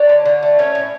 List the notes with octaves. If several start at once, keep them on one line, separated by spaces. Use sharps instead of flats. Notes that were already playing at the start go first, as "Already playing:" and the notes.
Already playing: D4 C#5
D3
D3
A3
C#4 C#5
A2